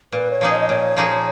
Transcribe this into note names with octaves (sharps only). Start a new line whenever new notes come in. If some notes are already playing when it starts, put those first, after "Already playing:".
A#2 B4
C#5
F3 A#3 D#4 G#4
D#5
D#5
A#2 C#5
F3 A#3 D#4 G#4